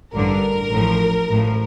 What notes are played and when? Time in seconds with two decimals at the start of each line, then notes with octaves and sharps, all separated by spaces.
0.12 A1 G2 D3 A#4
0.70 A1 A2 F3
1.28 A1 A2 F3